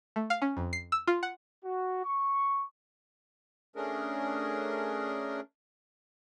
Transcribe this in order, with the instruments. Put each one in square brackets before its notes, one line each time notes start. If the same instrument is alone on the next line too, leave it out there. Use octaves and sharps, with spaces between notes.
[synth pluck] A3
F5
C#4
F2
C7
E6
F4
F#5
[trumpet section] F#4
C#6
[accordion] A3 C#4 D4 G#4 A#4